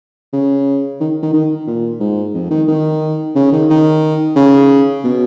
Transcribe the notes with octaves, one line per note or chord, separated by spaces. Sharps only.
C#3
D#3
D#3
D#3
A#2
G#2
F2
D#3
D#3
C#3
D#3
D#3
C#3
B2